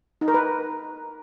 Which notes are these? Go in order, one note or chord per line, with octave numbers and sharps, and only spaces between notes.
D#4
A#4
B4